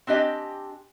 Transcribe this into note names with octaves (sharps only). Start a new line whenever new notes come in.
C4 D4 G4 D#5 G#5